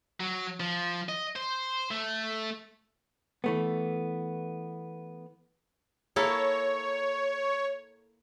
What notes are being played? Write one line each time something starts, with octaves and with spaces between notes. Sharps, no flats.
F#3
F3
D#5
C5
A3
E3 A3 B3
A#3 E4 A4 C#5